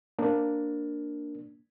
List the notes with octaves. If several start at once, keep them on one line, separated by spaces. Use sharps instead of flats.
A#3 D4